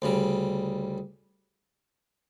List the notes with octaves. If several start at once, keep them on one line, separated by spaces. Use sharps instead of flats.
D2 C#3 G3